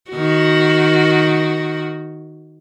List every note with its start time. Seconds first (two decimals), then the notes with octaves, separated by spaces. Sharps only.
0.11 D#3 F#4